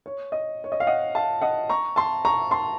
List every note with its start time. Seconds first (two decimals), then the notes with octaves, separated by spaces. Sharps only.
0.06 C#5
0.32 D#5
0.64 C#5
0.72 D#5
0.80 F5
0.87 D#5 F#5
1.15 F5 A5
1.41 D#5 F#5
1.69 A#5 C#6
1.96 A5 C6
2.25 A#5 C#6
2.51 A5 C6